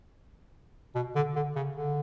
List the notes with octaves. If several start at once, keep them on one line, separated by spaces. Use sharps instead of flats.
B2
D3
D3
C#3
D3